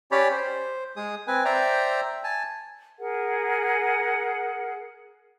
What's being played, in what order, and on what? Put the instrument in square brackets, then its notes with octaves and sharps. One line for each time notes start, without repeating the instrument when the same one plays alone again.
[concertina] C#4 G4 C#5 D5 B5
C5
G#3 G#4 D#6
C4 B4 G#5
C5 D5 E5 G5 A#5
G#5 A5
[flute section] G#4 A#4 F#5